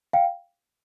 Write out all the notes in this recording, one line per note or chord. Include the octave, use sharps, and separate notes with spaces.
F5 G5